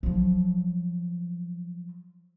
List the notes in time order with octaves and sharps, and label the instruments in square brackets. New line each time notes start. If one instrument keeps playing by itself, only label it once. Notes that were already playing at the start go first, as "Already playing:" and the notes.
[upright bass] F3 F#3